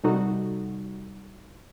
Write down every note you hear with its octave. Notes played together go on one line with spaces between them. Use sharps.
C3 G3 D#4 F#4 A4